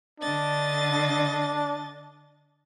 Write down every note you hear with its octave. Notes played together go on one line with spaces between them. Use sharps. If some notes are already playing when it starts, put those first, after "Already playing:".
D3 D4 D#5 A6